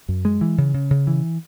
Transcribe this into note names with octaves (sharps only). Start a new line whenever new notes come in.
F#2
G#3
E3
C#3
C#3
C#3
E3